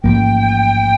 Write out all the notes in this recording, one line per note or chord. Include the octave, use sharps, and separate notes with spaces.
A1 G#2 F3 A#3 G5